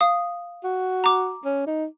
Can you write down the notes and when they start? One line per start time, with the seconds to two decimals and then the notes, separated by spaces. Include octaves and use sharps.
0.01 F5 D#6
0.64 F#4
1.04 A#5 D6
1.45 C#4
1.67 D#4